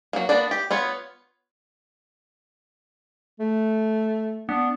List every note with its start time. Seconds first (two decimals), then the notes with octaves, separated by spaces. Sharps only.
0.13 F#3 A#3
0.29 A#3 B3 D4 D5
0.51 G4
0.71 B3 F4 C#5
3.40 A3
4.49 B3 D4